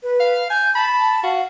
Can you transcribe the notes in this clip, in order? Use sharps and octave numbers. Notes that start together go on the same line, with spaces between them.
B4
F5
G#5 G6
A5 B5
F#4 F5